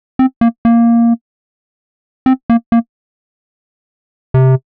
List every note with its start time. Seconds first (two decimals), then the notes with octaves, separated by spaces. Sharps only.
0.19 C4
0.41 A#3
0.65 A#3
2.26 C4
2.50 A#3
2.72 A#3
4.34 C3